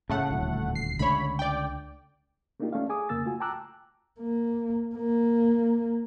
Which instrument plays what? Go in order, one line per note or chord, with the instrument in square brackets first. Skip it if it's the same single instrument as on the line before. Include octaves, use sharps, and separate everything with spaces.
[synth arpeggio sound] A2 A3 F#5 [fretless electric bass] C#3
[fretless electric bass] D#1 D2
[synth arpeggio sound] C7
[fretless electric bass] C#2 D3 A3 [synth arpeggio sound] C#5 B5
[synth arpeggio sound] D5 G5
[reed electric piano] A3 A#3 D4 D#4 F4 G4
A3 C#4 C#5 D5 F5
G#4 G#5 D6 D#6
F2 C#3 A#3 E6 A6
A3 F4 F#4 G#5
G5 A5 A#5 D6 E6 F#6
[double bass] A#3
A#3